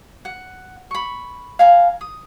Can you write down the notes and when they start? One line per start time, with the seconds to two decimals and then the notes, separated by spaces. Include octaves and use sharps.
0.25 F#5
0.91 B5 C#6
1.59 F5 G#5 A#5
2.01 D#6